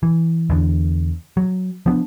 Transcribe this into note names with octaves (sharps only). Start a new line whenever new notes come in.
E3
E2 D3
F#3
F3 B3 D4